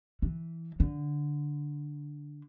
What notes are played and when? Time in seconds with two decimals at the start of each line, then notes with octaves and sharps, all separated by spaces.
0.22 E3
0.80 D3